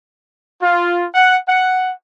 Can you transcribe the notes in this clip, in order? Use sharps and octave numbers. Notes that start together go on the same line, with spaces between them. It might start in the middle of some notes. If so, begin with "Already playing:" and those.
F4
F#5
F#5